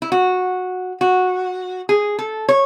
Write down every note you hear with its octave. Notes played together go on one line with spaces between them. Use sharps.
E4
F#4
F#4
G#4
A4
C#5